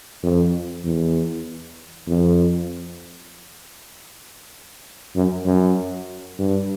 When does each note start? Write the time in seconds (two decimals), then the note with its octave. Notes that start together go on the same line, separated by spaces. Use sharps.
0.23 F2
0.85 E2
2.08 F2
5.15 F#2
5.46 F#2
6.39 G2